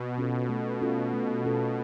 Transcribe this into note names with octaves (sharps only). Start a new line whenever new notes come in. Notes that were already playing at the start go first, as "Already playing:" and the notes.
Already playing: B2
C#4 F4 A4
A3
C#4 F4 A4
A3
C#4 F4 A4